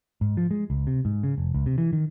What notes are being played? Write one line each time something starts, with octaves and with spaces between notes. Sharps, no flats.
G#2
F3
G#3
C#2
C3
G#2
C#3
F1
C#2
C3
E3
D#3